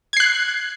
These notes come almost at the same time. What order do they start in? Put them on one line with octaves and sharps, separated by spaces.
G#6 C7 F#6